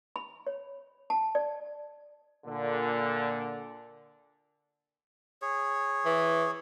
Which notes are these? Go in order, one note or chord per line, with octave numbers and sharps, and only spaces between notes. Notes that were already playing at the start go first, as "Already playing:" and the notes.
B5
C#5
A5
D5
A#2 D3
G#4 C#5
E3